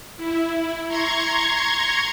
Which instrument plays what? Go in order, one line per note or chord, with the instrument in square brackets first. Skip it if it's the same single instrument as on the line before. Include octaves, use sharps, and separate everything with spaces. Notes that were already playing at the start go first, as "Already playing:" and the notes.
[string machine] E4
A#5 C6 C#6 G#6